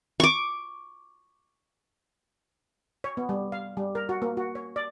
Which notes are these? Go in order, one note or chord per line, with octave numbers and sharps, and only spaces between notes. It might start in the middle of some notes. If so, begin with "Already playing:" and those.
C#6 D6
C#5
B3
G3
F5
G3
A#4
F#4
A#3
F#4
C#5
D5